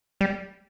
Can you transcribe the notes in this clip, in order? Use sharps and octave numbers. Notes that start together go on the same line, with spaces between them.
G3